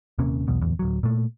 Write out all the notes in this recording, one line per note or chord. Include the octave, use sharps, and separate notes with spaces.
D#1 C3 A#3 C#4
B1 E2 B2
D1 G1 E2
D1 F#3
A#2 A3